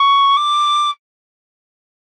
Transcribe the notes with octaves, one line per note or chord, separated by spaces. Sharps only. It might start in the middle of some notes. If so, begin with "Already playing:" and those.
Already playing: C#6
D6